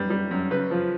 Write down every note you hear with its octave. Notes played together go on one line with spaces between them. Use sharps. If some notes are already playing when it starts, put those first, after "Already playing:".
Already playing: F#2 G3 B3
G3
F#2
C#3 B4
F3